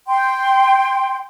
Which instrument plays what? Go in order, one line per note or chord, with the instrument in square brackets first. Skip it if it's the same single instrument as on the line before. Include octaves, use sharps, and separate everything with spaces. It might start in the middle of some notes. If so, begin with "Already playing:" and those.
[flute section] G5 C6